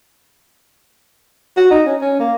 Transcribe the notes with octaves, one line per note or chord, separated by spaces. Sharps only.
F#4
D#4
C#4
C#4
A#3